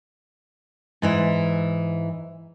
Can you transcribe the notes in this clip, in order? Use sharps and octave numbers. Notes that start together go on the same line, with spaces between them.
G#2 E3 E4